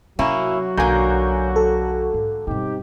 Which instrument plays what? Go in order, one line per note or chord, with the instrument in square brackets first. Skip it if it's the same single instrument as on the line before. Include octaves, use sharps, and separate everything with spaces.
[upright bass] C3 [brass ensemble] F#3 F#4 [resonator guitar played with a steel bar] A#3 C#4 E4
[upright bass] B1 [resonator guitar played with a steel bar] D3 A#3 [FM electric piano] G#5 A#5 G6
[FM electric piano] A4
[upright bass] G#2
[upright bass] G2 B2 [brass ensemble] C4 D#4 G4